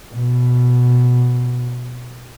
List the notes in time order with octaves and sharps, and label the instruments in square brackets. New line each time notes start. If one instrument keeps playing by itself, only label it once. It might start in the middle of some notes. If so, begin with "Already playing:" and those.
[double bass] B2